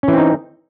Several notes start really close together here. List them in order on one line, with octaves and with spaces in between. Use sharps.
C#4 E3 C4 D#4